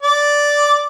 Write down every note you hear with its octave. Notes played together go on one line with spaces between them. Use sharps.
D5